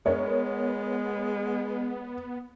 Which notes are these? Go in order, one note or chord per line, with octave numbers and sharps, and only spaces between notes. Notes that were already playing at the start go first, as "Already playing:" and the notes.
G#3 B3 A#4 C#5